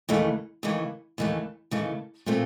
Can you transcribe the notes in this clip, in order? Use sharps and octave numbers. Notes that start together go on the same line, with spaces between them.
D#2 C#3 E3 A3
D#2 C#3 E3 A3
D#2 C#3 E3 A3
D#2 C#3 E3 A3
A#2 F3 A3 C4